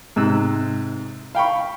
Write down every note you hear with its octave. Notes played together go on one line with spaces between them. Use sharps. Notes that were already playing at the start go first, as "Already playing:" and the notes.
G#2 C3 E6 F#6
F5 G5 B5 C#6